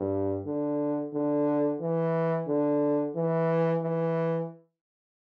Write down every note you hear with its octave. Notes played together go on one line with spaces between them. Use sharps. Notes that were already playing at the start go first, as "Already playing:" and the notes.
Already playing: G2
D3
D3
E3
D3
E3
E3